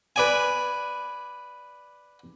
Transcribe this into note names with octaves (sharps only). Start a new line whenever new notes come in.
B4 D5 G#5